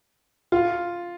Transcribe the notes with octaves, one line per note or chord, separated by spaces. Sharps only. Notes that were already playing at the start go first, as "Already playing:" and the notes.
F4